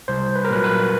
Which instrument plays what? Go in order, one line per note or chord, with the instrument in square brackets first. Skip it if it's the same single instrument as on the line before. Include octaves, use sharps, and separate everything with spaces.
[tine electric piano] C2 C5
B4
A#4
A#2 F#3 B4
B4